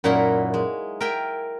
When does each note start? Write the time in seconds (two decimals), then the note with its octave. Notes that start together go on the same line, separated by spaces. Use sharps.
0.04 F#2 A#2 D#4 E4 F#5 C6
0.54 G#3
1.00 A#4 E5 G5 G#5